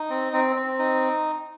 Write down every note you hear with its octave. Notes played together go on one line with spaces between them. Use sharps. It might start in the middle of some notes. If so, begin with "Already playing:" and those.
Already playing: D#4
C4
C4
C4
D#4